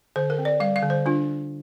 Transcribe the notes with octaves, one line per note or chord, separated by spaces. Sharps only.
D3 C5
A#4
C4
D5
G3 F5
F5
D3
C5
D4 F4